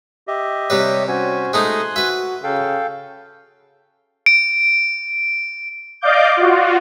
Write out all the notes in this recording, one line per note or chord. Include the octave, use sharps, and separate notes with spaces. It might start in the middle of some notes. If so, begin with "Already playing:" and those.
G4 D#5 E5
C3 G3 B4 C#5
C#4 F#4 C5 G#5
G#3 A3 D#4 G#5 C6 F#6
F#4 B4 E5
C#3 A4 F5 G5
D7
D5 D#5 F5 D6 G6
F4 F#4